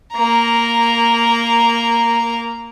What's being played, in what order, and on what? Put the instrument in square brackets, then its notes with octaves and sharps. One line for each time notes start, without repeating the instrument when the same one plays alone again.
[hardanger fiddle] A#3 A#5